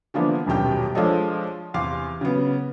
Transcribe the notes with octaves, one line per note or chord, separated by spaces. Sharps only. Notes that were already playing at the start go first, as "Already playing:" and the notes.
D3 E3 F3 A#3 B3 D4
D#1 F#2 B2 G4 G5
F3 G#3 D4 A4 C#5 D#5
E2 C3 F5 C6 D6
C#3 F#3 B3